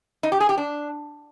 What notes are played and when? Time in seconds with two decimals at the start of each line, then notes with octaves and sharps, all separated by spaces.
0.23 D#4
0.32 G4
0.40 G#4
0.49 G4
0.58 D4